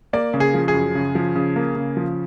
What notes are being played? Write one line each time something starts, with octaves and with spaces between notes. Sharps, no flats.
A#3 D5
C#3
G#4
F3
G#4
F#2
C#3
F3
C#3
A#3
C#3
F3